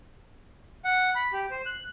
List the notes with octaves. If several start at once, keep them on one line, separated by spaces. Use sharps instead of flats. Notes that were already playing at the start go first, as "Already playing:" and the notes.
F#5
B5
G4
C5
F#6